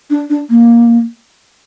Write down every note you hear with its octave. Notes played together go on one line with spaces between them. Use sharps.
D4
D4
A#3